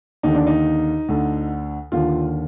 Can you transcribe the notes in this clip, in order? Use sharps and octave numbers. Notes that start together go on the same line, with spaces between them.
D#2 D3 D#4
D4
D#4
D2 D3
D#2 D3 F4